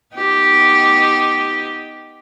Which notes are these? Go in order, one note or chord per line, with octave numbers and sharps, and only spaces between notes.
B3 D#4 G4